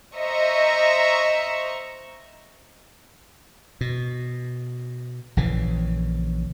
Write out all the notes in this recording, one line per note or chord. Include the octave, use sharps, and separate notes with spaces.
C5 D#5 E5 A#5 C#6
B2
A#1 C#3 E3